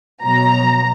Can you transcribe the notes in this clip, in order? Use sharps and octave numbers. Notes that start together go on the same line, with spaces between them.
B2 F#3 A#5